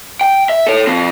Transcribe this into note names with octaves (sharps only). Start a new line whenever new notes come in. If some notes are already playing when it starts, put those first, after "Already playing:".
G5
E5
A4 C#5
F3 C4